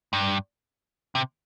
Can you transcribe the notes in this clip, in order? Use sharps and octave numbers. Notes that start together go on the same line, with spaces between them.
G2
C3